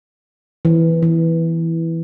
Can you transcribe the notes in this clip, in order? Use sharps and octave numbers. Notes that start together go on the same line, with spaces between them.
E3
E3